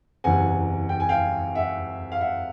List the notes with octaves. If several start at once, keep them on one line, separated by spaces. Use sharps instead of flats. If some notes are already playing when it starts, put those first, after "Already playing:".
F#1 E2 C3 F#5 G#5
G5
G#5
F5 G5
E5 F#5
F5
E5 F#5